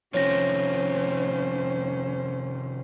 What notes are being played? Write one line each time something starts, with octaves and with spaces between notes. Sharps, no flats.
C3 D#3 F3 C#4 C5 C#5 A#6